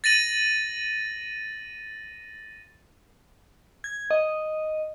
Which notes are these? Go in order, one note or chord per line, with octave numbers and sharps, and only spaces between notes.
A6 A#6 D#7 F#7
G#6
D#5